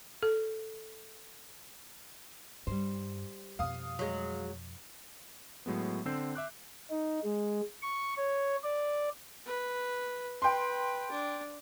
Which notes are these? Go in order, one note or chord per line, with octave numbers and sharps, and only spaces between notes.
A4
G2 G3 C5
F2 B2 F5 D#6
F#3 G#3
A2 F#3 G#3 B3
D3 C4 E6 G6 C7
E5 D6 F#6
D#4
G#3
C#6
C#5
D5
B4
B4 G5 C6
D4